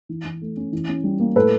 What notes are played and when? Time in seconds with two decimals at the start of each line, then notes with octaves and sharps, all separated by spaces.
0.09 E3
0.25 E3
0.42 A3
0.57 C#4
0.72 E3
0.89 C#4
1.04 G3
1.20 A#3
1.36 A2 A4 B4